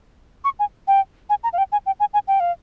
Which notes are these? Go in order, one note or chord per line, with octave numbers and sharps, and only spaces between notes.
C#6
G#5
G5
G#5
A#5
F5
G5
G#5
G5
G#5
G#5
G5
F5